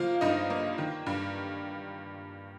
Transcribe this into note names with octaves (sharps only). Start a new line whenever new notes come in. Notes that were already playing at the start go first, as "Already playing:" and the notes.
Already playing: F3 A#3 F4 F5
G2 D#4 D#5
A#3
D#3
G2